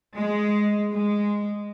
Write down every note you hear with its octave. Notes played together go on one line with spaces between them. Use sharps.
G#3
G#3